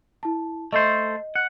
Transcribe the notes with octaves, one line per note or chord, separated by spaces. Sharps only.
E4 A5
A3 A4 C5 D#5
F#5